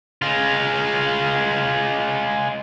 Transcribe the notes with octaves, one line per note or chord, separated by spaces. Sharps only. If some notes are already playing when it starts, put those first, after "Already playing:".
G#3 F4